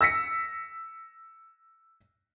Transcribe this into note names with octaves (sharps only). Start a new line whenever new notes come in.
E6 A#6 B6 C#7